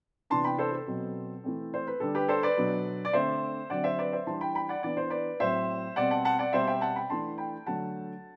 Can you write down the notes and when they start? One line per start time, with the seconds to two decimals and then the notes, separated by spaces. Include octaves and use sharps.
0.30 C3 E3 B3 D4 A5 C6
0.44 G5 B5
0.58 A4 C5
0.73 A4
0.87 B2 F#3 C4
1.44 E3 A3 C4
1.74 C5
1.87 B4
2.00 D3 G3 D4 A4
2.15 G4 B4
2.28 A4 C5
2.43 B4 D5
2.57 B2 F#3 B3 D4
3.05 D5
3.13 D3 A3 C4 C5 E5
3.70 D3 F#3 C4 D5 F#5
3.84 C5 E5
3.98 B4 D5
4.13 C5 E5
4.27 E3 G3 D4 A5 C6
4.41 G5 B5
4.55 G5 B5
4.69 D5 F#5
4.83 E3 B3 D4 D5
4.97 C5
5.10 B4 D5
5.40 A2 F#3 C4 C5 E5
5.96 B2 G3 C4 D5 F#5
6.11 F#5 A5
6.25 F#5 A5
6.39 D5 F#5
6.53 B2 G3 C4 C5 E5
6.67 E5 G5
6.81 F#5 A5
6.96 G5 B5
7.10 E3 A3 D4 A5 C6
7.38 G5 B5
7.66 D3 F#3 A3 F#5 A5